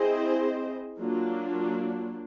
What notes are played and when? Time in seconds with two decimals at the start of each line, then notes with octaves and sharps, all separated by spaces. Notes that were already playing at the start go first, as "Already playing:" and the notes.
Already playing: C4 E4 G#4 C5 D#5
1.00 F#3 A#3 D4 F4